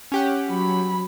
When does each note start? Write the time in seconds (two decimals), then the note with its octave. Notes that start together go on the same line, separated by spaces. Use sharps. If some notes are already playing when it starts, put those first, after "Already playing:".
0.12 C#4 G4 F#5
0.49 F#3 B5